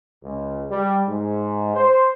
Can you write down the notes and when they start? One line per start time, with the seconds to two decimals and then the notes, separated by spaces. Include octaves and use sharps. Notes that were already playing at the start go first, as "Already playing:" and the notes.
0.23 C#2
0.70 G3
1.07 G#2
1.75 C5